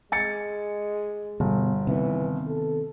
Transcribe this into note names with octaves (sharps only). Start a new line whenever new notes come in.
G#3 G#5 A6 C#7
G1 B2
C3 D#3 E3 B3
A4